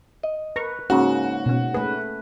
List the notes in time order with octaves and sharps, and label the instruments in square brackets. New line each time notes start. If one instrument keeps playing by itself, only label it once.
[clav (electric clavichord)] D#5
[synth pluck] A#4 A#5 C#6 [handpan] B4
[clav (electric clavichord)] G#2 C#3 [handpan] A#3 C#4 [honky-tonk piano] F#4
[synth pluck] B2 C#4
[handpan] A3 B4 [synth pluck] G#4